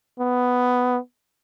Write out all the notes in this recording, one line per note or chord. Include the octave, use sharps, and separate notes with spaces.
B3